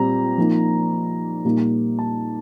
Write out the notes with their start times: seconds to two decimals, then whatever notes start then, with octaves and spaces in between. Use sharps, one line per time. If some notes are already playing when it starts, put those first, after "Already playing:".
Already playing: A#2 G3 C4 A#5
0.38 F3 A#3 D#4
1.44 A#2 G3 A#3 D#4
1.99 A5